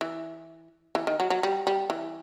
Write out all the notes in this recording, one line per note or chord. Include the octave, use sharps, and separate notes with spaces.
E3
E3
D#3
F#3
F#3
G3
G3
E3